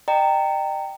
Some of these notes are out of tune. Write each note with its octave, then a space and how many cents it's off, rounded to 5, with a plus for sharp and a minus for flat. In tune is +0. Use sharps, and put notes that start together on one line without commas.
D#5 -40 G5 -5 A#5 -20